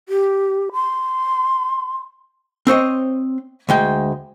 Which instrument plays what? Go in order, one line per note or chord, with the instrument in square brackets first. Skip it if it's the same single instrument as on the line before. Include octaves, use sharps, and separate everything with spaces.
[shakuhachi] G4
C6
[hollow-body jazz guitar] C4 C5 C#5 D#5
D2 G#3 G5